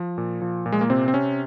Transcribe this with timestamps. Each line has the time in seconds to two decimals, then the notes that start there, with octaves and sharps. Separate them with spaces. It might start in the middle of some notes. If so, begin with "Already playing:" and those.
Already playing: F3
0.18 A#2
0.42 F3
0.66 A#2
0.72 G#3
0.81 A#3
0.90 C3 C4
1.08 C4
1.14 C3 C#4